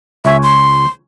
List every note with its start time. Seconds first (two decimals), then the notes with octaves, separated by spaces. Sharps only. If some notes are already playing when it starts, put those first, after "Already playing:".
0.25 C#2 C#5 E5 G#5
0.43 C6